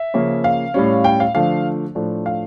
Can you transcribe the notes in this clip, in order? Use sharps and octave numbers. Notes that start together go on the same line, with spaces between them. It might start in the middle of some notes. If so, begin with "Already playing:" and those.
Already playing: E5
C#3 F3 A#3 C#4
F5
A2 G3 C#4
G5
F5
D3 F3 A3 D4 F5
A2 F3 A3 D4
F5